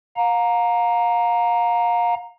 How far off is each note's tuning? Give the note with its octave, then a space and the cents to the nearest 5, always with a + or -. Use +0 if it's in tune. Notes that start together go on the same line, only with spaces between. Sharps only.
F5 +30 A#5 +0